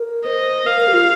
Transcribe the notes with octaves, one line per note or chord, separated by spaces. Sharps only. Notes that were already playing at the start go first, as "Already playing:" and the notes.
Already playing: A#4
C5 D#5
A#4 F5
A#4
G4
F4